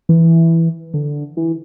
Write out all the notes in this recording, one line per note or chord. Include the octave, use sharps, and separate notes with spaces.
E3
D3
E3